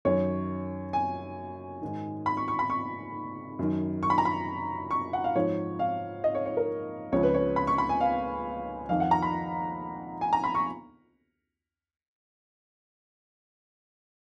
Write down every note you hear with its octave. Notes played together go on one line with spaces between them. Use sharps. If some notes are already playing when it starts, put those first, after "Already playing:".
F#2 D#3 C#5
G#5
G#2 D#3
B5
C#6
C#6
B5
C#6
F#2 D#3
C#6
B5
A#5
B5
C#6
F#5
F5
G#2 F3 C#5
F5
D#5
C#5
C#5
A#4
C#2 C#3 F3 C#5
B4
C#5
B5
C#6
B5
G#5
F5
F2 D#3 F5
F#5
A#5
B5
G#5
A#5
B5
C#6